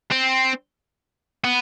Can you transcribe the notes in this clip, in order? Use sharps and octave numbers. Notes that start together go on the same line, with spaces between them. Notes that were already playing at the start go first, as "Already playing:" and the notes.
C4
B3